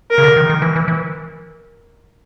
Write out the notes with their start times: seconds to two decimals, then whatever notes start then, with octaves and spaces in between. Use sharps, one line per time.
0.11 A#4
0.18 C#3
0.24 D3
0.36 D#3
0.50 D#3
0.62 E3
0.76 E3
0.88 E3